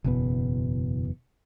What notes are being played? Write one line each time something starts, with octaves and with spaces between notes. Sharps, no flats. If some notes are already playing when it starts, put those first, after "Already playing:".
F#1 E2 B2 B3